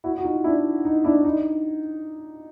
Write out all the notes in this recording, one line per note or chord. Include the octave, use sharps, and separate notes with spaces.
E4 F#4
F#4
D#4 F4
D4 E4
D#4
D4 E4
D#4